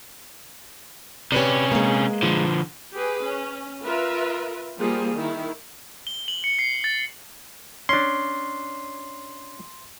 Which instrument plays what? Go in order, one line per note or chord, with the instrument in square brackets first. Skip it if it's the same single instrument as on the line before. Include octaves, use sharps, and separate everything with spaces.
[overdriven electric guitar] C3 C#4 [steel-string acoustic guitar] G4 B4 D5
[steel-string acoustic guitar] G#3 A#3
[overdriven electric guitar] D3 F3
[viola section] G4 G#4 B4
C#4
F4 A#4 B4 E5
F3 G3 A#3 G#4
D#3 E4
[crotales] G7
F#7
C#7
C7
A6
[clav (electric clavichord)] C#4 D4 [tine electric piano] C6